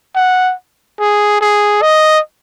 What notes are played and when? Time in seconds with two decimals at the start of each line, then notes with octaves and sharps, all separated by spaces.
0.15 F#5
0.99 G#4
1.41 G#4
1.82 D#5